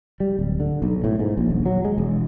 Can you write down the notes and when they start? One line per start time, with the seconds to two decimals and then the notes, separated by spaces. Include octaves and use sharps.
0.20 G3
0.39 D1
0.60 D3
0.82 B1
1.04 A2
1.19 G#2
1.37 A#1
1.50 D#1
1.66 F#3
1.85 G#3
1.98 E1